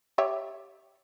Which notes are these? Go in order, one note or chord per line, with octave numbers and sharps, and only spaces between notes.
G4 C#5 E5